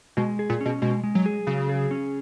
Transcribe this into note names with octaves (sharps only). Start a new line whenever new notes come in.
B2 G#3
G#4
A#2
B2 C#4
B2 G#3
G#3
F#3
G#4
C#3 F#3
G#4
C#4